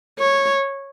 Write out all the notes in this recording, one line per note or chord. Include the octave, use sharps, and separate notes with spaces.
C#5